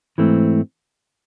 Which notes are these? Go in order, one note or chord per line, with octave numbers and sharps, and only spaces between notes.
G#2 E3 A3 C4